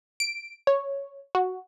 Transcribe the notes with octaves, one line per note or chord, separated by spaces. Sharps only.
D7
C#5
F#4